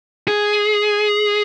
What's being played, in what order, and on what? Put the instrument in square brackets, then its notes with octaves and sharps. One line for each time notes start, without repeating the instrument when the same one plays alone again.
[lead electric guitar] G#4